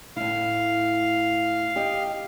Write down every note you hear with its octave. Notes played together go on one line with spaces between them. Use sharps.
A2 E4 F5
G4 D#5